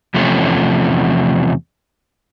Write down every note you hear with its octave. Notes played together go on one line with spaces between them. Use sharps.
E2 C3 F3 A3 C#4